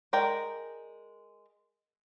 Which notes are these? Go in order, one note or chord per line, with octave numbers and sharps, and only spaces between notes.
G#3 A#4 D5 G5